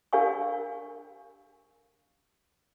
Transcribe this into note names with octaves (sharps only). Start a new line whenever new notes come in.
D4 G4 A#4 F5 G#5 C#6